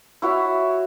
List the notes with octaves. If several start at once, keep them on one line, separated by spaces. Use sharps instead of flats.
E4 F#4 C#5 E5